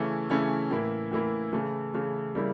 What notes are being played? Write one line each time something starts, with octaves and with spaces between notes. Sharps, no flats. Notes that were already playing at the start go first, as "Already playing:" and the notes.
Already playing: C#3 E3 A3 C#4 E4
C#3 E3 A3 C#4 E4
A2 E3 A#3 E4
A2 E3 A#3 E4
C#3 E3 A3
C#3 E3 A3
C#3 G3 A#3 E4